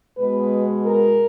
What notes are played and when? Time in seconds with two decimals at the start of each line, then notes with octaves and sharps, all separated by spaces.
0.18 B2 G#3 B3 B4
0.85 A#4